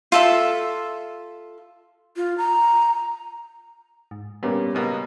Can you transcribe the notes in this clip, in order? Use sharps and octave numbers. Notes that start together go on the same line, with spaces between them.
F4 A4 E5
F4
A#5
G#2
A#2 G3 B3 C#4 A#4
C#2 B2 A#3